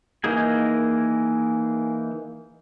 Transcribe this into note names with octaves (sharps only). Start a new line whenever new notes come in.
E3 A#3 D#4 G#4 G#5